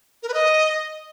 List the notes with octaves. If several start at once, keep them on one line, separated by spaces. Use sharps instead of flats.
A#4
B4
D#5